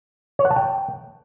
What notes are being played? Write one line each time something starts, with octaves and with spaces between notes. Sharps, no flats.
C#5
F#5
A5
G5